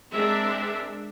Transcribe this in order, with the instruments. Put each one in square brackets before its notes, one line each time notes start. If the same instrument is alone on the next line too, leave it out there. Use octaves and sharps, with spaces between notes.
[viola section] G#3 C4 D4 A#4 E5